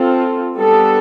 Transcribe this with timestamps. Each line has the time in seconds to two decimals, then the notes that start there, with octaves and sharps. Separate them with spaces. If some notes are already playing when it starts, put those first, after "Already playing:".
Already playing: C4 F4 A4
0.56 G3 B3 D4 A4